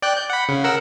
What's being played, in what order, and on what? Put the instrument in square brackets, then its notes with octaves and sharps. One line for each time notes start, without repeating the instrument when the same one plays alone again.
[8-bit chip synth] D5 G5 F#6
G6
F#5 B5
C#3
A#4 F#5 E6